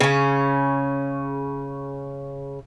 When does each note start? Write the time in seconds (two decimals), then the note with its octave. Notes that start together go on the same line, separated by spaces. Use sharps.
0.01 C#3 C#4